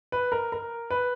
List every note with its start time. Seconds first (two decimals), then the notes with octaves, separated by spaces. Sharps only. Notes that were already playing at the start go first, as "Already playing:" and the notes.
0.12 B4
0.32 A#4
0.52 A#4
0.90 B4